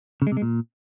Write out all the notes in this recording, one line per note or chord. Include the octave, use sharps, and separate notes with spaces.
C#3
G#3
C3
G#3
A#2